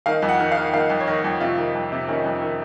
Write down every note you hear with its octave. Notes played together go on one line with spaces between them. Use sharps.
D#3 F5
F2
F#5
D#3
F5
D#3
D#3 F5
F2
C#5
D#3 D#5
F2
C3 F4
D#3
F2
C3
D#3 C#4
F2
D#3